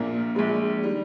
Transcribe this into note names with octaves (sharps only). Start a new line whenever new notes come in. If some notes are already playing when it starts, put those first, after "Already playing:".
Already playing: A#1 A#2 A#3
A#1 A#2 G#3
D#3 G3